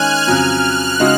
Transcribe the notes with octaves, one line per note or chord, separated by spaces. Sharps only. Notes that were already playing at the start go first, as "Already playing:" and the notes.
Already playing: D#3 G#3 C#4 G#5 F6 F#6
F2 C#3 F#3 F6
F#6
C#3 G#3 D#4 F#4